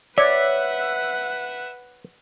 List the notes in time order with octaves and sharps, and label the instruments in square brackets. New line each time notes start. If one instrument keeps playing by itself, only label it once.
[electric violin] B4 F#5 [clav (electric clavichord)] C#5 [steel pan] D5 [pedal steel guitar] E5